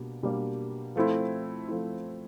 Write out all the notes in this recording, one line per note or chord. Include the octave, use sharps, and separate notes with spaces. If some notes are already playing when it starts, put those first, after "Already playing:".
Already playing: B2 G3 A#3 D4
B2 G3 A#3 D4
F3 A3 C4 E4
F3 A3 C4 E4